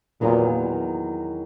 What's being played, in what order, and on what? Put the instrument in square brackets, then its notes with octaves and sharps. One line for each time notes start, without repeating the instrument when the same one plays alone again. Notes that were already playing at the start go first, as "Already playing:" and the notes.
[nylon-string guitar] E2 D#3 F#3 B3 [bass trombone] A#2